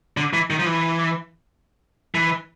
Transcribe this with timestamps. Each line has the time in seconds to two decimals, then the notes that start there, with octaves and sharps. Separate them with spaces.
0.17 D3
0.33 E3
0.50 D#3
0.59 F3
0.66 E3
2.15 E3